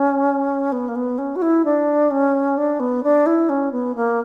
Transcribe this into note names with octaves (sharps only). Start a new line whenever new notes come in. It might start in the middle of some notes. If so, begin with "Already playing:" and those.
Already playing: C#4
B3
A#3
B3
C#4
F#4
E4
D4
C#4
D4
B3
D4
E4
C#4
B3
A#3